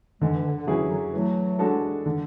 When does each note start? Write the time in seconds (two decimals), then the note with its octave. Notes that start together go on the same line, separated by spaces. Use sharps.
0.21 D3 E3 G#3
0.35 E3
0.44 D3
0.57 D3
0.67 C#3 E3 F#3 C#4 E4 G#4
0.90 D3 F#3
1.13 E3 F#3 A3
1.59 G#3 D4 F#4 A4
2.06 D3